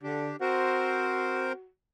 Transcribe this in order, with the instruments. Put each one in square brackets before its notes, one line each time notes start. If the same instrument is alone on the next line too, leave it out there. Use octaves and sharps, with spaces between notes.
[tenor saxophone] D3 [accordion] D4 G4
[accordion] C4 A#4 C5 [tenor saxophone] F#4